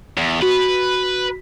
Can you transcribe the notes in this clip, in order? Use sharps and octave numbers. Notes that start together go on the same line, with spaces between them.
E2
F#4 B4